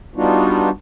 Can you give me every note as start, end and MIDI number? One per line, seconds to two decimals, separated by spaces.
0.16 0.70 55
0.16 0.70 59
0.16 0.70 62
0.16 0.70 63
0.16 0.70 65
0.16 0.70 66